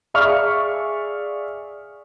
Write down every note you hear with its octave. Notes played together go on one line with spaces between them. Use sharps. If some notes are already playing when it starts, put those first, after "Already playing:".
G#4 D5 E5 F5 C#6 F6